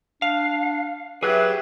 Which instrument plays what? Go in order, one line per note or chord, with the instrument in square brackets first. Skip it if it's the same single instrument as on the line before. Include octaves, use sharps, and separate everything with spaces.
[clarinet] D4 [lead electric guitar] F5
[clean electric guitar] F#3 [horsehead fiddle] G4 E5 [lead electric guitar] G#4 [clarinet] B4